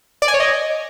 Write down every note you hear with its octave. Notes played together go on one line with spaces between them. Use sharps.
D5
G#5
C#5
D#5